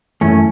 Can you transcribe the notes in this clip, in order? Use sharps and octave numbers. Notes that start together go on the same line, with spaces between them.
F#2 E3 A3 C#4